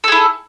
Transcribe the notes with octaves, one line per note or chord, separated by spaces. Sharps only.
E4 G#4 A4